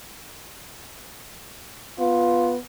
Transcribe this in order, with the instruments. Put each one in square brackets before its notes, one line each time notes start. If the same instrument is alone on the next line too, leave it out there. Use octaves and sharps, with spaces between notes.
[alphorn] B3 [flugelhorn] F4